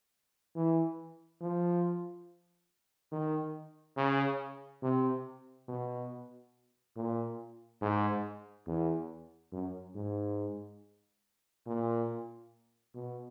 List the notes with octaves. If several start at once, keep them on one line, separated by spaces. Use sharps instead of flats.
E3
F3
D#3
C#3
C3
B2
A#2
G#2
E2
F#2
G#2
A#2
B2